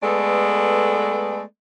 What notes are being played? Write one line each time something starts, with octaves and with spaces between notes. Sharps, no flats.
G#3 A3 B3 A4 B4 D5